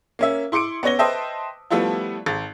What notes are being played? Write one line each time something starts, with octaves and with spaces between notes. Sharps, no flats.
A#3 C#4 E5
E4 C6 D6 C#7 D7
B3 C#4 C#5 A#6 G7
B4 C5 D#5 E5 G5 A5
F3 G3 A3 B3 E4 F4
G#1 A6